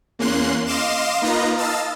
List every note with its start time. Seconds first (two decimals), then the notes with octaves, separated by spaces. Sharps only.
0.19 E2 A#3 C#4 C6 F#6
0.67 D#5 F5 C6 D6 E7
1.22 A#3 D#4 F4 B4 D#5 A#5
1.58 D#5 F5 A5 E6 A6